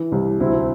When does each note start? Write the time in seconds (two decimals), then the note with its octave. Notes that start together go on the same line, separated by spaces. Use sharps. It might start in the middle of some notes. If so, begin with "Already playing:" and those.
Already playing: E3
0.12 C2
0.40 D2 C4 E4